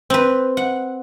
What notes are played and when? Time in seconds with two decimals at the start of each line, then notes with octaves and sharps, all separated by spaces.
0.10 C4 B4
0.57 F#5